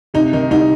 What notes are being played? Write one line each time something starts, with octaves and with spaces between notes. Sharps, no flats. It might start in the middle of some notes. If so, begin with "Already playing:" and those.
C3 D#4
D#3 D#4
C2 D#4